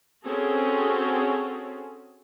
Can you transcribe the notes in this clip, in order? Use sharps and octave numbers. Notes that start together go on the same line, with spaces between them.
C4 C#4 F#4 G#4 A4